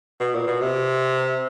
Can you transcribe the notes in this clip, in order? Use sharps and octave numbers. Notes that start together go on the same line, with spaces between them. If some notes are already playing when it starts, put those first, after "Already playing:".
B2
A#2
B2
C3